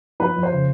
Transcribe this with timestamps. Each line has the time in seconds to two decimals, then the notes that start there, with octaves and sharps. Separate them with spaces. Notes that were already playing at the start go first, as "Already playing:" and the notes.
0.20 F3 B4
0.36 F2
0.43 C5
0.51 C#3